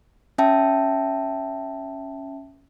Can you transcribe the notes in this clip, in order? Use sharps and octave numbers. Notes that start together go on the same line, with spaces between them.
C#4 E5 G5 A5